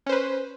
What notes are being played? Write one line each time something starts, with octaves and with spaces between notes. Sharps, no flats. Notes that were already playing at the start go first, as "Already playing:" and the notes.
C#4 B4 C5